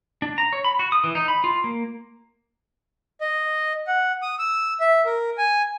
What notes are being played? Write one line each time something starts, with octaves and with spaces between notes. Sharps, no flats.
D4
A#5
C#5
B5
F#4
D#6
E3
D#4
B5
F4
A#3
D#5
F#5
D#6
E6
E5
A#4
G#5